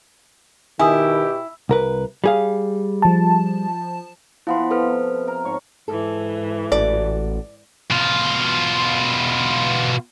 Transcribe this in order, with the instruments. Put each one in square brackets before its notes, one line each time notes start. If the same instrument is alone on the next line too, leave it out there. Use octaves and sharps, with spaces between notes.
[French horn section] B2 G4 [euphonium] D#3 [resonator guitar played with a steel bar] E4 [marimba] G#5 D#6
[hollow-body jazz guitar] C2 A#4 B4
G3 G#4 F5
[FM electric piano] F3 A5
[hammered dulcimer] F3 B3 [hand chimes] E4 F5 C6
[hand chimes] A4 B4 F6
[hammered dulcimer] C3
A#4 A#5
G#2 C#5 C#6
[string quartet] G#2 E3 [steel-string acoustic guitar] A4
[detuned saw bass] A1 [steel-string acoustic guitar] F#4 A4 [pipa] D5
[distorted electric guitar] B2 F4